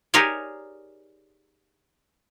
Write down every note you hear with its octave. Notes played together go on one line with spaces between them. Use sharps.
D#4 G4 G#4 A#4 C#5 D5